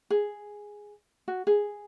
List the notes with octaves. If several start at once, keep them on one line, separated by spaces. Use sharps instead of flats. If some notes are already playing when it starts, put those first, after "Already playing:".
G#4
F#4
G#4